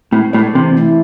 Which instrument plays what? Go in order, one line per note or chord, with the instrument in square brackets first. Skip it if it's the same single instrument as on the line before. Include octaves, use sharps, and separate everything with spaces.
[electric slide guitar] A2 [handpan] C4
[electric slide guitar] A2 [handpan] D5
[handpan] A4
[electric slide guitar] C3 [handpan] E3
[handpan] A3 E4